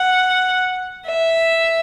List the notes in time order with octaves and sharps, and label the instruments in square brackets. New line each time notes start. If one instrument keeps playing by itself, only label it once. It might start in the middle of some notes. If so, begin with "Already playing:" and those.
Already playing: [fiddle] F#5
E5